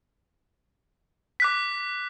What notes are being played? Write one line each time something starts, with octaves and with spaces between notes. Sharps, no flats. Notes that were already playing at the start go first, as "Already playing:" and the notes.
D6 F#6 B6